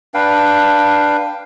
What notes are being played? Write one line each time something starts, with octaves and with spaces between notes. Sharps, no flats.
D4 B4 F5 G5